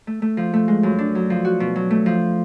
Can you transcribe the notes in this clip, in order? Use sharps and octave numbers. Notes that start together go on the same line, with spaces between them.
A3
A3
F3
A3
G#3
F#2
D4
F#3
F3
F#4
B2
F#3
A3
F3